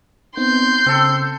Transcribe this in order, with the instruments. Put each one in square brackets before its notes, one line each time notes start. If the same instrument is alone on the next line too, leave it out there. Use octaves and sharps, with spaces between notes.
[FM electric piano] B3 C4 D#4 [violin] C6 G6
[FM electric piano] C#3 [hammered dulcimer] C4 A4